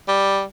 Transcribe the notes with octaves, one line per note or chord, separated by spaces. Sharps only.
G3